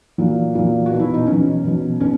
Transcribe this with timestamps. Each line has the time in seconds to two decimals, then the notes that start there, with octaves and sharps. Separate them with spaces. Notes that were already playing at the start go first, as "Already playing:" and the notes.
0.18 A#2 F#3
0.55 A#2 F#3
0.86 F#4
0.91 B2 F#3
1.00 E4
1.14 D#4
1.27 B2 C#4
1.32 F#3
1.63 B2 F#3
2.00 B2 C#4